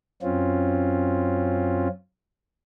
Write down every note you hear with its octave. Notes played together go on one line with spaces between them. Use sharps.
F#2 C4 C#4 F4